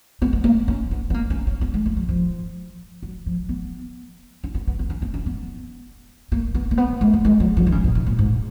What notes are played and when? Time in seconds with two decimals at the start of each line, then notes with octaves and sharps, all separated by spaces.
0.22 B3
0.33 B3
0.44 A#3
0.68 C#4
0.91 B3
1.10 B3
1.14 A#3
1.30 C#4
1.47 C#4
1.61 B3
1.74 G#3
1.86 A#3
1.97 F#3
2.09 F3
3.03 F#3
3.26 F3
3.49 B3
4.44 C#4
4.55 B3
4.67 B3
4.79 B3
4.90 C#4
5.02 B3
5.14 C#4
5.26 B3
6.32 A#3
6.55 B3
6.71 A#3
6.78 B3
7.01 G#3
7.13 A#3
7.25 G#3
7.40 F#3
7.57 F3
7.67 D#3
7.72 C#3
7.84 B2
7.95 C#3
8.07 A#2
8.19 G#2